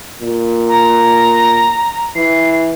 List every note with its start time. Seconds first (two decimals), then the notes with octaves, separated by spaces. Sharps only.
0.21 A#2
0.69 A#5
2.15 E3 C7